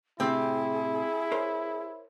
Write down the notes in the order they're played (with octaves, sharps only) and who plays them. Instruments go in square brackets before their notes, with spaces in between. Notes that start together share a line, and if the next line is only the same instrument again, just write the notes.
[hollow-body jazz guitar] A2 C3 [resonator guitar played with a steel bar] C4 G4 [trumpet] E4 [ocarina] G#4
[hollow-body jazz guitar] A#4 C5 C#5